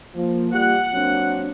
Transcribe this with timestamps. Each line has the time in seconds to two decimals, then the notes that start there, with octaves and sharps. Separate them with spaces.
0.14 F3 A#3
0.53 G3 F4 G4 F#5
0.93 F#3 A#3 C4 D4